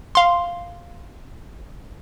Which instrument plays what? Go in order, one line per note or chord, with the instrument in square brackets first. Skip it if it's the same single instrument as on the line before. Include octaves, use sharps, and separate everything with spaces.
[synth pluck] F5 C6